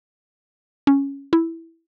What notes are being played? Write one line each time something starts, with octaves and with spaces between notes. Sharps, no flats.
C#4
E4